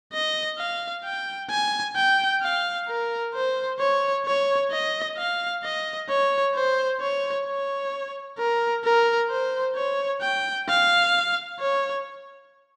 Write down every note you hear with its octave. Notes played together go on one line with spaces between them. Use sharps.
D#5
F5
G5
G#5
G5
F5
A#4
C5
C#5
C#5
D#5
F5
D#5
C#5
C5
C#5
C#5
A#4
A#4
C5
C#5
G5
F5
C#5